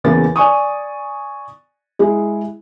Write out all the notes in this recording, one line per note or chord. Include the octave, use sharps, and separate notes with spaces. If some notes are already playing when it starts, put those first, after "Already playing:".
E2 C#3 A#3 A#4 A6
D5 G#5 C#6 D#6
G#3 E4 G#4